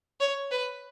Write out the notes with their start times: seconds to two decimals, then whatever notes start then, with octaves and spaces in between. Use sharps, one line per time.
0.20 C#5
0.51 B4